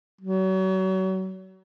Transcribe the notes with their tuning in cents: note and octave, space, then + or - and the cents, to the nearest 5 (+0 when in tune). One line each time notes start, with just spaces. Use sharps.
F#3 +35